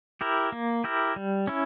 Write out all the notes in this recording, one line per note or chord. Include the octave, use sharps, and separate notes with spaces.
E4 G4 A#4
A#3
E4 G4 A#4
G3
C#4 E4